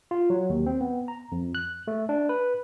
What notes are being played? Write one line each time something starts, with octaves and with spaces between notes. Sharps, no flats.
F4
F#3
D#2
C4
B3
A#5
F2
F#6
A3
D4
B4